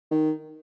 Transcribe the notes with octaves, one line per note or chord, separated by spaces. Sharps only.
D#3